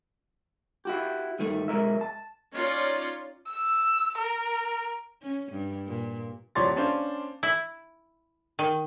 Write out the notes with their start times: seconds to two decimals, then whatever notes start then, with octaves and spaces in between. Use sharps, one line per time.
0.85 E4 F#4 G4
1.39 G2 D#3 A3
1.68 B1 G#3 A#4 E5
2.01 A5
2.53 C#4 D#4 F4 C#5 D5
3.48 E6
4.18 A#4
5.22 C#4
5.52 G2
5.87 A#2
6.55 D#1 F3 C#5 D5 C6 A6
6.76 C#4 D4 C5 F5
7.43 E4
8.59 D#3